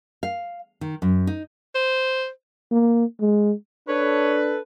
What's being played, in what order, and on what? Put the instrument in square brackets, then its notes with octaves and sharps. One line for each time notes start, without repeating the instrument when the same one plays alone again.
[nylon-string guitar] F5
D#3
F#2
D#4
[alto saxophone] C5
[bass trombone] A#3
G#3
[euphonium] D4 [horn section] A4 B4 [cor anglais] C#5